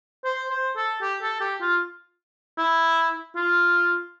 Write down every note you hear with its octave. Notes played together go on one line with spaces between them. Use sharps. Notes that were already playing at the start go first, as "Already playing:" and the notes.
C5
C5
A4
G4
A4
G4
F4
E4
F4